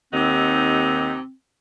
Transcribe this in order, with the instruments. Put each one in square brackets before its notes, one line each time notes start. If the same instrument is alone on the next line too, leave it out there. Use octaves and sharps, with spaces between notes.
[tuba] D#2 [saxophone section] C3 D#4 F#5 [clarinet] C4